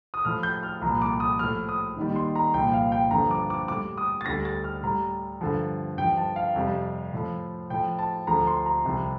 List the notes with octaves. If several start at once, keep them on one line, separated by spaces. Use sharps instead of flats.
D#6
A2 F3 F6
G6
F6
C2 A#2 F3 A#5
D6
D#6
A2 F3 F6
D#6
D#2 D#3 G3
C6
A#5
C2 A#2 F3 G5
G5
F5
G5
G2 D3 F3 A#5
D6
D6
A2 G3 D6
D#6
A6
D2 D3 G3 A#6
A6
F6
A2 G3 A#5
G2 D3 F3
G2 G5
F3
A5
F5
F2 C3 G3
A2 F3
A2 F3 G5
A5
D2 D3 F3 A#5
C6
A#5
C2 C3 F3